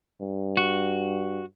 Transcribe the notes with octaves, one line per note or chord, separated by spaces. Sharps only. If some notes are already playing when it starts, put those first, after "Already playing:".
G2
F#4